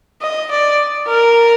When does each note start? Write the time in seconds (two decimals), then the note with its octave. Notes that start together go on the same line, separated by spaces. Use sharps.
0.22 D#5
0.51 D5
1.08 A#4